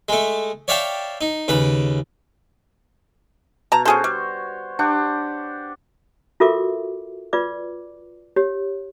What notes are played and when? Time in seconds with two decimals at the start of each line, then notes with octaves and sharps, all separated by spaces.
0.09 G#3 A3
0.68 C#5 D5 E5 F5 G5 A5
1.21 D#4
1.48 D#2 C#3 B4
3.72 B2 A5 A#5
3.85 C#4 F#4 G#4 A4 C5 C#5
4.04 G3
4.79 D4 G4 F#5
6.40 F4 F#4 A4 A#4 E5 D6
7.33 F4 B4 D5 D6
8.36 G4 C#5